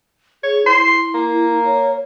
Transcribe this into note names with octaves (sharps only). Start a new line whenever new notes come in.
G#4 C#5
E4 C6
A#3
C#5